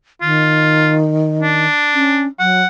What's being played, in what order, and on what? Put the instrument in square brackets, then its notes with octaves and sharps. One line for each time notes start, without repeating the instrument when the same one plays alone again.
[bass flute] D#3 [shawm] F4
[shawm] D4
[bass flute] C#4
[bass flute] F#3 [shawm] F#5